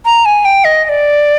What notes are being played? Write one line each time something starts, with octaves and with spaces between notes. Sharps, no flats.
A#5
G#5
G5
D#5
D#5
D5